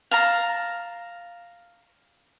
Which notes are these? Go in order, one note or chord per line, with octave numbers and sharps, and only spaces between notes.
F5 A5 A#5